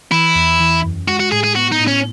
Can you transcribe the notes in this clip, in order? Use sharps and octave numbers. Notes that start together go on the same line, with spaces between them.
E3 E4
E2
E3
F#2
G#3 F#4
F#4
A2 G#4
G#4
B3 F#4
D#4
A2
C#4